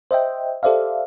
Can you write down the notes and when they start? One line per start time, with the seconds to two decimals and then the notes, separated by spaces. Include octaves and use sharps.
0.11 C5 D#5 E5 G5
0.63 G4 A4 C5 D5 E5 F5